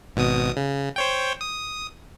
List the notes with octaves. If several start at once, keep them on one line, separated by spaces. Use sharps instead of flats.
G#1 B2 D#6
C#3
C5 C#5 G5
D#6